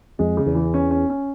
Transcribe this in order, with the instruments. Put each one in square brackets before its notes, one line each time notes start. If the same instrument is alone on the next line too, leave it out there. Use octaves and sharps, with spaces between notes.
[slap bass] F2 [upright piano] G#3
[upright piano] C#3
[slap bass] E2
[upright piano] E3
C#4
C#4
C#4